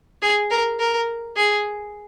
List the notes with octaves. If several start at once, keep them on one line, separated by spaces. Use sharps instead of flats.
G#4
A#4
A#4
G#4